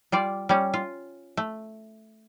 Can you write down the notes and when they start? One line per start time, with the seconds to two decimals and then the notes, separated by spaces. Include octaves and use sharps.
0.12 G3 F4 D5
0.49 G3 C#4
0.74 F4
1.37 A3